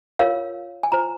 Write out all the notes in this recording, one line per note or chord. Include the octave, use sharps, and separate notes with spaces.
F4 A#4 C#5 F5
G#5
F4 C5 A#5